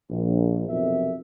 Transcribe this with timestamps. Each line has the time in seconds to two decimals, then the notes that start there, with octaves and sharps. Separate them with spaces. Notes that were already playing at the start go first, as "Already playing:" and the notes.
0.10 A#1
0.69 B1 F2 C3 B3 A#4 E5